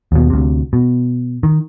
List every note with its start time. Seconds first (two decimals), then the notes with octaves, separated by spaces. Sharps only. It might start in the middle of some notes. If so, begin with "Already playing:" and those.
0.12 D#2 B2
0.30 D2 C3
0.73 B2
1.43 D#3